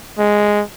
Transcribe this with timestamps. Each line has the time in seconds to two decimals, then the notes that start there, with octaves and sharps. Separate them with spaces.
0.18 G#3